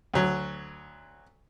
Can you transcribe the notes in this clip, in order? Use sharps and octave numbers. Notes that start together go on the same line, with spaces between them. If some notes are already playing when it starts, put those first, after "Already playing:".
D2 F#3